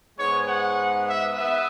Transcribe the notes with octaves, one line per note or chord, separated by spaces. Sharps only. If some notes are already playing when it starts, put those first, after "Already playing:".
G#2 G#3 B3 C#5
F#5
E5
B3 E5